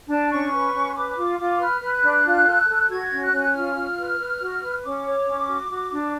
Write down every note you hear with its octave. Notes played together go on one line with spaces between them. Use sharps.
D4 A5
C#4 C#6
B4
C#4
B4 D6
F4
F4
B4 F6
B4
F#6
D4
F4
A4
A4
F#4 G#6
C#4
F#6
C#4
F4 F6
F4
B4
B4
F#4
B4
C#4 D6
C#5
C#4
F#4
F#4
D4